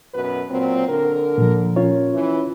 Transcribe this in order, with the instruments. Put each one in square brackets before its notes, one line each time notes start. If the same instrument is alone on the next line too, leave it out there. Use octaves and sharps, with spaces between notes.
[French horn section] F#2 B2 B4
A#2 F#3 C4
D3 A#4
[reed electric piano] A#2 F3
C#4 F4 C#5
[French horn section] E3